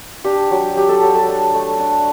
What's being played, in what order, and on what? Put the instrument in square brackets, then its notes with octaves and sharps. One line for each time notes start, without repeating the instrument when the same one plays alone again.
[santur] D4 G4
F#3
F#3 G4
A4
F#3 A4
A4
D4
A3
D4